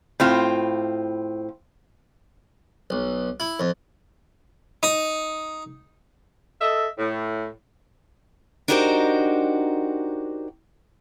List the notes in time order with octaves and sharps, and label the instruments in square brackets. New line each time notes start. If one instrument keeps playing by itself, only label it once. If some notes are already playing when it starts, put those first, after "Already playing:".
[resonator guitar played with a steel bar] A2 C4 F4
[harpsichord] B1
E4
F2
D#4
[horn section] A4 D#5 E5
A2
[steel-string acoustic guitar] D4 D#4 F#4 G4 A#4 C5